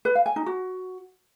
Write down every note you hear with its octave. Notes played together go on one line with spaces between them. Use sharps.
B4
F5
G#5
D#4
F#4